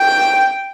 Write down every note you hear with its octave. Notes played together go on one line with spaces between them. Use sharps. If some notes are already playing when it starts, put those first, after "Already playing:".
Already playing: G5